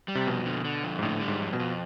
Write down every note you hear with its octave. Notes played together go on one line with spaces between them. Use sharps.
G3
C3
F2 B2
D3
D3
F2
G#2
A2 D3
G3
G#2
F2
B2
F2